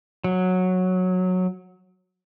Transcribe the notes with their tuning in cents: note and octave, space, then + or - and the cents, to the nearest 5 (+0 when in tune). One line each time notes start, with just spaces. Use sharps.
F#3 -10